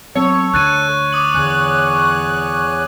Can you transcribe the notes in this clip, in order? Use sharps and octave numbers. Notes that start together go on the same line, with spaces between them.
F#3 B3 C4 A4 C#5
D2 D4 F#6 A6 D#7
D6 D#6 F#7
E2 D3 G#5 F#6